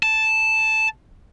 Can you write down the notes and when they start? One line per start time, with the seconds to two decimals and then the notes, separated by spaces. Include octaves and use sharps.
0.03 A5